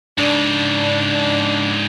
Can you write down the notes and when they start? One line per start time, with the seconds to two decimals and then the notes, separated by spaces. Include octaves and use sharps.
0.18 G#2 C#3 D4